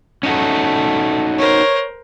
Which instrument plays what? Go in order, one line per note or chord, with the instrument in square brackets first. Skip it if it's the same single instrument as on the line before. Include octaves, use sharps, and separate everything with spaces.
[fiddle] A3 [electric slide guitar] C#4 D#4 F#4
[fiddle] A#4 C5 [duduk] C#5